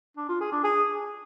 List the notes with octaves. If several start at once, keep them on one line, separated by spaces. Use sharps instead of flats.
D4
F4
G#4
D4
G#4